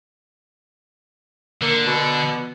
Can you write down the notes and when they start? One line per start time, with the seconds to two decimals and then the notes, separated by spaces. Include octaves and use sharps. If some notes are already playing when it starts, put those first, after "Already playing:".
1.62 D3 A#3
1.87 B2